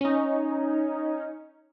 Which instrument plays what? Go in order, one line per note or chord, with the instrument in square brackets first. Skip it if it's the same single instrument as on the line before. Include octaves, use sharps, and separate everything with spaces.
[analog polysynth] C#4 D#4